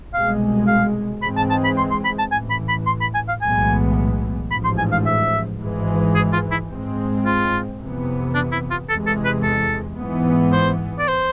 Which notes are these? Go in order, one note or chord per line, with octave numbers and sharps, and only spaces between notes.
C2 B2 G#3 F5
F5
G#2 E3 G#3 C4 B5
A5
A5
B5
C6
C6
B5
A5
A1 A2 E3 G#5
B5
B5
C6
B5
G#5
F5
B1 A2 E3 G#3 B3 G#5
A1 G#2 F3 B5
C6
G#5
F5
E5
G#1 G#2 E3 G#3
G#4
F4
E4
G#2 G#3 C4
F4
F2 C3 E3 B3
D4
E4
F4
E2 C3 E3 G#3 A4
A4
B4
A4
G#2 E3 B3
C5
D5
C5